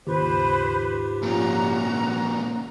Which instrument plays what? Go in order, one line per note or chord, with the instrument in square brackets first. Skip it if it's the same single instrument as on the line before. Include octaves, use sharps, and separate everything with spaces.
[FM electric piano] D#2 C#3 [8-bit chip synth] G#2 F4 G4 [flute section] B4 C5
[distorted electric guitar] A#2 C#3 [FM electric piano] F3 [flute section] F#4 A#5